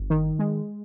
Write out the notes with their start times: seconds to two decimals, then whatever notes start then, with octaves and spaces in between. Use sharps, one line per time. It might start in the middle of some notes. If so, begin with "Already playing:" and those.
Already playing: G1
0.10 D#3
0.39 G#3